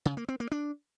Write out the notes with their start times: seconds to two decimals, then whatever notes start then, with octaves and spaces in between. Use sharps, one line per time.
0.05 C#3
0.17 A#3
0.29 C4
0.40 A#3
0.52 D4